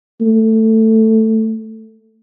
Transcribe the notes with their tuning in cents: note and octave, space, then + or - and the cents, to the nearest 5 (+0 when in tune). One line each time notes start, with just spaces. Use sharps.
A3 +10